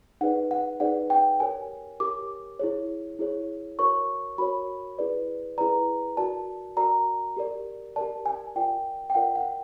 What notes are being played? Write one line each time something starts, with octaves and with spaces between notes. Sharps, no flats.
D#4 G#4 B4 D5 F#5
F#5
D#4 G#4 B4 D5 F#5
G5
G4 A#4 C#5 G#5
G4 A#4 C#5 D6
E4 G#4 C#5
E4 G#4 C#5
F#4 A#4 C#5 C#6
F#4 A#4 C#5 B5
E4 G#4 B4 D5
E4 G#4 B4 D5 A#5
F#4 A#4 D5 A5
F#4 A#4 D5 A#5
G4 A#4 D5
G4 A#4 D5 A5
G#5
F4 A#4 D5 G5
G5
F4 A#4 D5 F#5
F#5